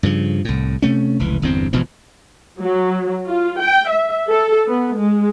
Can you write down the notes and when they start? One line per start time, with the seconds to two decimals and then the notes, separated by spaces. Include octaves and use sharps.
0.03 G2 C#3 F3
0.45 C2 A2
0.82 C3 A3 C#4
1.19 F1 C#2 E3
1.42 G1 E2 G2 C4
1.73 G#1 B2 E3 F3
2.60 F#3
3.26 F4
3.60 G5
3.90 E5
4.29 A4
4.67 B3
4.97 G#3